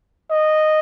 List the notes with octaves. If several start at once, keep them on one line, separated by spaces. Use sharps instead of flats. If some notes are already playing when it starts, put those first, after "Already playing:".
D#5